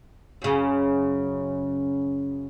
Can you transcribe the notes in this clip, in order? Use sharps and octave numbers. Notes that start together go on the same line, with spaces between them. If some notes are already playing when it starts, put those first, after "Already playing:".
F#2 C#3